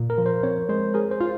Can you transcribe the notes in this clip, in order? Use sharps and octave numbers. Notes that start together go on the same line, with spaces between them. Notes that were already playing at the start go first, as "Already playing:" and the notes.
Already playing: A#2
A#4
F3
C5
C4 C#5
G#3 C5
G#4 A#4
C5
F4